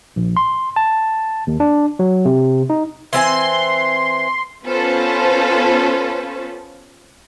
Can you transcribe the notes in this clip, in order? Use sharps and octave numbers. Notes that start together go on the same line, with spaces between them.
A#1
C6
A5
D#2
D4
F#3
C3
D#4
E3 C4 G#5 C6
B3 C#4 F4 A4 B4 C5